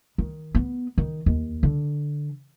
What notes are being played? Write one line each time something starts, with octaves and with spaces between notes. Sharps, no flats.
D#3
B3
D#3
D#2
D3